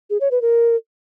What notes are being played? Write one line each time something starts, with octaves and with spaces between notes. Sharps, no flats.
G#4
C#5
B4
A#4